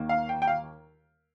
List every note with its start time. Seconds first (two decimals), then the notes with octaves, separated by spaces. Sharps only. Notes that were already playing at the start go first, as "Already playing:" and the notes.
Already playing: D#2 D#3 A#3
0.09 F5
0.29 G5
0.42 G5
0.47 F5